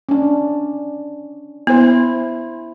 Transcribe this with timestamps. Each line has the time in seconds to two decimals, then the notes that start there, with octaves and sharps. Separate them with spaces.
0.09 C#4 D4
1.67 B3 E4 C5